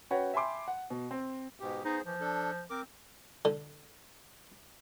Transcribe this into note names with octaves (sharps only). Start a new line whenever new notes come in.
C#4 F#4 B4 C#5 F#5 G5
E5 G5 G#5 B5 C6 D6
F#5
B2
C4
G#2 B2 G4
B3 D#4 G#4 C5
E3 F3
D4 A4
C4 A#4 D6
D3